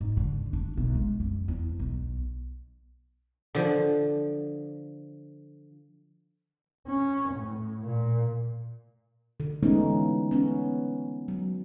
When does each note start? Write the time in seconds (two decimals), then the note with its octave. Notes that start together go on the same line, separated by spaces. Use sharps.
0.01 G#2
0.17 D3
0.53 D4
0.77 B1
0.95 G#3
1.20 F#2
1.48 E2
1.79 B1
3.55 D3 F3
6.87 C#4
7.33 A2
7.82 A#2
9.40 D3
9.63 E3 G#3 A3 B3 C#4 D#4
10.31 B3 C#4
11.28 F#3